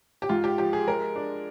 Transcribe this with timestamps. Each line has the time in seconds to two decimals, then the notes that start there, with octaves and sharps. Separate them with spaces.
0.22 G4
0.29 G#2 F4
0.44 G4
0.58 F3 G4
0.73 G#4
0.87 G#3 A#4
1.16 D4